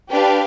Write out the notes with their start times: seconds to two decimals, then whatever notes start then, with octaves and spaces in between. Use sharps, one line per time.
0.11 D4 G4 B4 F5